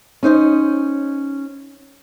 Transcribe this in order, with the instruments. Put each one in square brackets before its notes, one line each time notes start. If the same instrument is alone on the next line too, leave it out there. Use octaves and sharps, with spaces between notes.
[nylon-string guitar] C#4 D#4 C5 D#5